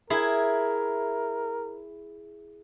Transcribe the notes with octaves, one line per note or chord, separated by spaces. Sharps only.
E4 G#4 A#4